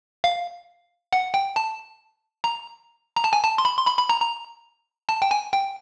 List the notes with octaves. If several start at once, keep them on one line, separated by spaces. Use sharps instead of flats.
F5
F#5
G5
A5
A#5
A#5
A5
G#5
A5
C6
B5
C6
B5
B5
A#5
A#5
A5
G5
G#5
G5